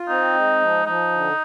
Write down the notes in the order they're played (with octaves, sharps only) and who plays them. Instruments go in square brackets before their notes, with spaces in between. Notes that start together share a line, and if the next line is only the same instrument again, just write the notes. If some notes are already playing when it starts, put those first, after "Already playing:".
Already playing: [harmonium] F4
[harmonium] C4 [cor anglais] D#4
[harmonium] G#3
F3
[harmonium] F3 [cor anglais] D#4
[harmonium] D3